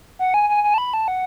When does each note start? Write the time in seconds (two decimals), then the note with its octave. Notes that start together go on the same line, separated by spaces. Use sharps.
0.19 F#5
0.34 G#5
0.49 G#5
0.64 G#5
0.74 A5
0.78 B5
0.94 A5
1.08 F#5